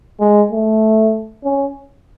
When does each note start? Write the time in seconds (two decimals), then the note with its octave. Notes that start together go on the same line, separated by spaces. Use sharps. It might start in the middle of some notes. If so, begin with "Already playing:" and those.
0.20 G#3
0.52 A3
1.44 C#4